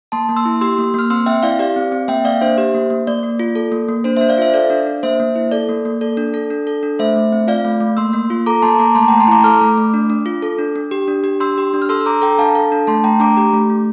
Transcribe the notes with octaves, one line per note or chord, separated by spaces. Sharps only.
A#3 A5 C6
A#3
C6 E6
E4
G4 C6 E6
A#3
A#3 F6
C4 C6 E6
C4 E5 G5
E4 D5 F5
G4 D5 F5
C4
C4
A#3 E5 G5
A#3 D5 F5
D4 C5 E5
G4
A#3
A#3
A#3 D5
A#3
F4
A4
A#3
A#3
D4 C5
D4 C5 E5
D5 F5
F4 C5 E5
A4 D5 F5
D4
D4
A#3 C5 E5
A#3
E4
A4 D5
A#3
A#3
A4 D5
D4
A4
D4
A4
D4
A3 C5 E5
A3
C4
F4 D5 F5
A3
A3
A#3 C6 E6
A#3
F4
A4 A#5 D6
A#3 A5 C6
A#3 A#5 D6
A3 A5 C6
A3 G5 A#5
A5 C6
E4 A#5 D6
A4 D6 F6
A3
A3
D4
D4
F4
A4
D4
D4
G4
D4
G4
D4 C6 E6
G4
D4
F6
A4 C6 E6
E6
D4 A#5 D6
A4 G5 A#5
D4 F5 A5
A4
D4
A3 A5 C6
A3 G5 A#5
D4 A#5 D6
G4
A3
A3